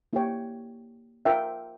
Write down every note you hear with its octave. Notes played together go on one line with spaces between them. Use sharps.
A#3 E4 G4 C#5 G5
F4 A#4 E5 G5